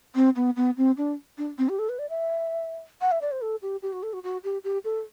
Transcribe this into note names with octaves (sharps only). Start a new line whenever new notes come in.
C4
B3
B3
C4
D4
D4
C4
G4
A4
B4
D5
E5
F#5
E5
D5
C5
A4
G4
G4
F#4
A4
F#4
F#4
G4
G4
A4